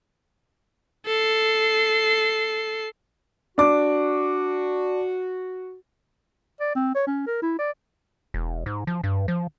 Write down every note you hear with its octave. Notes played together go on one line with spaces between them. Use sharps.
A4 C7
D4 F#4 D6
D5
C4
C#5
C#4
A#4
E4
D5
E1
G#2
F3
G2
F3